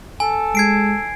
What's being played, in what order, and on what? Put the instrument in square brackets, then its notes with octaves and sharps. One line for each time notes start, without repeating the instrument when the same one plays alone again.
[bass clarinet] A4 [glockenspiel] G#5
[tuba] G#3 [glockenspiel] G#6 C7 D7